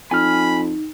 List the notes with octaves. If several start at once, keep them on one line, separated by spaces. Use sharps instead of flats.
F2 D#4 G#5 B5 F6